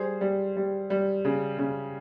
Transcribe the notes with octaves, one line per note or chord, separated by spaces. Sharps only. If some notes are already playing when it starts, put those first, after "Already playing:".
Already playing: G3 G#4 C5
G3
G3
G3
C#3
C#3